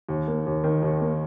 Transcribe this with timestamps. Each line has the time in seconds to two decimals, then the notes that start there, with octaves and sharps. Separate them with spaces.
0.09 D#2
0.28 A#3
0.46 D#2
0.64 D#3
0.82 D#2
1.01 A#3